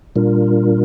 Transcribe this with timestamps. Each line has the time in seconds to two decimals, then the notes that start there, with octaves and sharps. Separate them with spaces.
0.15 A#2 G3 D4 F4 A#4